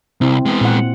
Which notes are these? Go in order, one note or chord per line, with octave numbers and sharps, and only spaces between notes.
C2 C4 E4
G#3 B3
A#2 F#5